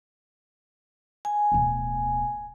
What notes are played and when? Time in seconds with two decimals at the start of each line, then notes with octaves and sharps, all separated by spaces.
1.25 G#5
1.52 D1 B2